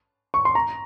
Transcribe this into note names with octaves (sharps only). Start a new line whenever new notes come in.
C#6
C6
A#5